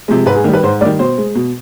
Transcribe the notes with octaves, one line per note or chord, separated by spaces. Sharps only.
C3 F3 G#3
G#2 B4
G#4
D#3 G3
B4
G#2 C5
D#3 G3 D5
B2 C5
G#3
B2